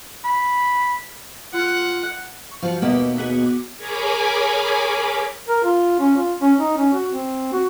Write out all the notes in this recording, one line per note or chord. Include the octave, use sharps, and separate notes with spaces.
B5
F4 F#5
C#6
F3 F#4 F5
D#2 B2 A#3 B4 E5
B3 F#4 G#4
D6
G#4 A#4 C#5 G#5 B5 D6
A#4
F4
C#4
F4
C#4
D#4
C#4
F#4
C4
F#4